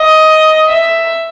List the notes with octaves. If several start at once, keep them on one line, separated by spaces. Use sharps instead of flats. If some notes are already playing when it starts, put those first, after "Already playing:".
Already playing: D#5
E5